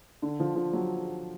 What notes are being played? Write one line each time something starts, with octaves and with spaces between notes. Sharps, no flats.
D3
F3
F3
F#3